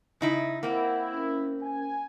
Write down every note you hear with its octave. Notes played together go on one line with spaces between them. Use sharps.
C#3 D#4 E4
A#3 C4 E4 A#4 F#5
C#4 A#4
G#5